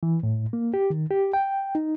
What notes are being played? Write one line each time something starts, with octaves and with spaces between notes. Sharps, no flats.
E3
A2
A#3
G4
D#3
G4
G5
D#4